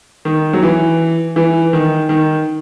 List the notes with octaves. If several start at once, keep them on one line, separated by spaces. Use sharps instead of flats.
D#3
F#3
E3
E3
D#3
D#3